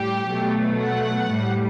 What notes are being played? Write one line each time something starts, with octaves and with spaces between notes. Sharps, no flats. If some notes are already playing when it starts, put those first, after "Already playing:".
Already playing: A2 G3 G4
B2 F#3 A3
F#5
A2 G3